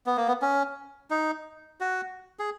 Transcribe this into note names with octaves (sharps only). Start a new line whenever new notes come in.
B3
A#3
B3
C#4
D#4
F#4
G#4